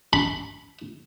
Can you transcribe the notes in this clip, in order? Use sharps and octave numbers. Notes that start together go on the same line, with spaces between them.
B5